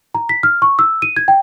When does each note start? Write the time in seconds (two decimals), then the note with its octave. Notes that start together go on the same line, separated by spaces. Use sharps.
0.15 A#5
0.29 B6
0.43 F6
0.62 C#6
0.79 E6
1.02 D#7
1.16 G#6
1.28 G5